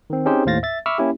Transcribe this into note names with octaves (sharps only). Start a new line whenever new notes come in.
D#3 C4
C4 C#4 D#4 G4 G#4 C5
D#2 A2 C5 F5 A6 A#6
E5 A6
E5 B5 C#6 D6 E6 F6
A#3 C#4 E4 G4